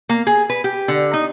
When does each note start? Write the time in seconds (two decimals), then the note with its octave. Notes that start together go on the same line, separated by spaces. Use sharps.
0.09 A#3
0.27 G#4
0.50 B4
0.64 G4
0.88 D3
1.14 D#4